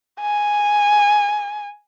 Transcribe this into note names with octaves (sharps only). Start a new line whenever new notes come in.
G#5